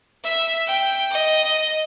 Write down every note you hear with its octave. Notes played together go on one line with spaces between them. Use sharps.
E5
G5
D#5